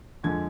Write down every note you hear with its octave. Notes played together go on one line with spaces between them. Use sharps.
F2 D3 F3 G#3 G#6